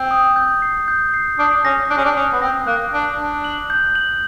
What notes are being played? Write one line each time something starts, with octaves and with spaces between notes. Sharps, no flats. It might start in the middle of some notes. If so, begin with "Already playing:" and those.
Already playing: C4
D#6
G6
C7
G6
C7
D4 D#6
C#4 A#6
D4 F#6
C#4
D4
C#4 D#6
B3
C4 A#6
A#3 F#6
D4 F#6
D4 F#6
F#7
G6
F#7